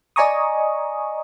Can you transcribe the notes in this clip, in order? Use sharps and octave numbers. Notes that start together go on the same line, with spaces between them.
D5 D#5 G#5 A#5 C#6 D#6